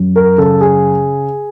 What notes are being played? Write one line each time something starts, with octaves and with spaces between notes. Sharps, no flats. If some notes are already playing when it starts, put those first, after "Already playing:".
Already playing: F#2
A#4
C#3 A4
G#4